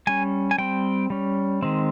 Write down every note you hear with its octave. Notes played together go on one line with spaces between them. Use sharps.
G3 C#4 G#5
G#5
G3 C4 G5
G3 C#4
D#3 G#3 C4